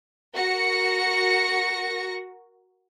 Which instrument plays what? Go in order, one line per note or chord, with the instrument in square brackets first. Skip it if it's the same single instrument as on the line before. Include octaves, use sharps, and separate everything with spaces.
[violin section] F#4 A#4 A#6 C#7